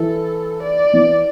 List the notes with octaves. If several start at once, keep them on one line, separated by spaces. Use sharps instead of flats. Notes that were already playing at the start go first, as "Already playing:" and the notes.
Already playing: E3 A4
D5
E3